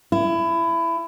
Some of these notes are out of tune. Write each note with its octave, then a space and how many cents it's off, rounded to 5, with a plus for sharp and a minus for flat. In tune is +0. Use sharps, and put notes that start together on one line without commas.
E4 +20